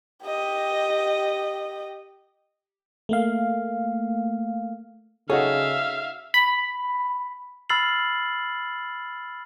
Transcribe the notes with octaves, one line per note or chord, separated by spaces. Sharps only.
G4 D#5
A3 A#3 F5
C#3 D#4 F#4 G#4 A4 C#5 E5 F5
B5
B5 E6 F6 A6 C7 F#7